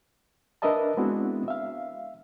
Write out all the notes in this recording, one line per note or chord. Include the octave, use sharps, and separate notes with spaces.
D4 A#4 B4 D#5 E5 A5
G#3 B3 C4 D4 E4 F#4
E5 F5